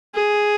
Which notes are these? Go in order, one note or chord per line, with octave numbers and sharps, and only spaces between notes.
G#4